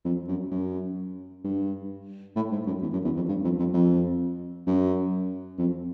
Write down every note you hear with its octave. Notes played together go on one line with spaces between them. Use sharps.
F2
F#2
F#2
G2
A2
G#2
F#2
E2
F#2
E2
F2
G2
F2
F2
F2
F#2
F2